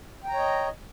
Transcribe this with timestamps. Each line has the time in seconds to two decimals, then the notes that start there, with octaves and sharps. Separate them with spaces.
0.24 G5
0.28 A#5
0.33 C#5
0.38 D#5